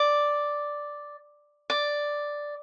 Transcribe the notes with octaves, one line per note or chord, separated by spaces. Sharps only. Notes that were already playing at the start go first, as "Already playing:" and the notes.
Already playing: D5
D5